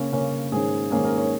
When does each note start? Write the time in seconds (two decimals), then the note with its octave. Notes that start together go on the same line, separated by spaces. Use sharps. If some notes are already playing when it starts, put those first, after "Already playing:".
Already playing: C#3 A#3 C#4
0.12 C#3 A#3 C#4
0.52 G#2 D#3 A#3 C#4 G#4
0.91 G#2 D#3 A#3 C#4 G#4
1.05 A#4
1.17 C#5